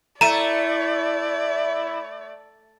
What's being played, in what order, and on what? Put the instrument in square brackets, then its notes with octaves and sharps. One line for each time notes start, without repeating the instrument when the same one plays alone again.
[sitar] A3 [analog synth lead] E4 [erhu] D5 [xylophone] A#5 D#7